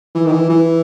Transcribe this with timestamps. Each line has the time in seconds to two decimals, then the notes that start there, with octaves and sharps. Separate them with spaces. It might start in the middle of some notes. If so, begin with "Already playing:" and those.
0.15 E3
0.26 D#3
0.32 E3
0.50 E3